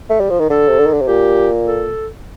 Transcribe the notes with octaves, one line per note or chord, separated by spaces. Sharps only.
A3
G3
F3
D#3
D3 A4
C3
D3
D#3
D3
C3
A#2 G4
A4